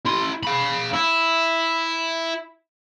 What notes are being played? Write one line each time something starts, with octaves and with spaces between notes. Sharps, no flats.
E4 C6
F5 B5
E4